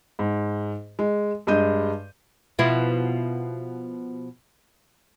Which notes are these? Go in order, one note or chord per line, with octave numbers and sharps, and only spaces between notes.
G#2
G#3
G2 G#3 D#5 G6 D#7
B2 F3 E4